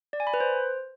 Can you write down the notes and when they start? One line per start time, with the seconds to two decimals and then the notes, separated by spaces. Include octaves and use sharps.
0.13 D5
0.20 G#5
0.27 B5
0.34 B4
0.40 C5